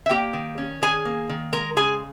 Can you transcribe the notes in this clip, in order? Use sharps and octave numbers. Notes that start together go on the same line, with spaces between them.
E5
A#3 G4 G5
D#3
C#4
D#3 G#4 G#5
A#3
D#3
G#3 A#4 A#5
C#3 G#4 G#5